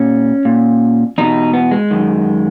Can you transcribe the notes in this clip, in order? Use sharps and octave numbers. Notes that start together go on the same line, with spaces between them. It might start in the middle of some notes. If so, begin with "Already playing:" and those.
Already playing: A#2 C#4
A#2
E2 B2 D#4
B3
G#3
F#2 D#3